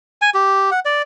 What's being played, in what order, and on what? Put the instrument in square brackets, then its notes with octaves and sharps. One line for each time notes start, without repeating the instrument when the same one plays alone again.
[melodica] G#5
G4
F#5
D5